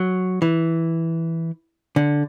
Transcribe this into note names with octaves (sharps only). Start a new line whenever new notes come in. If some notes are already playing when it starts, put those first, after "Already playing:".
Already playing: F#3
E3
D3